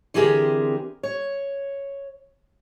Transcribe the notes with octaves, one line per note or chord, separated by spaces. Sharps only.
D3 E3 C4 G4 G#4 A#4
C#5